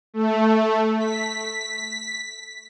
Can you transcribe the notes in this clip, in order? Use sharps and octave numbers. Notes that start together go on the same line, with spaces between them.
A3
B6